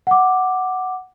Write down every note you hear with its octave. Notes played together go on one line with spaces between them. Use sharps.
F#5 D6